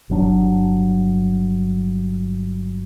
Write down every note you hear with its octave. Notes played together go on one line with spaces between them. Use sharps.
G1 F#3 D4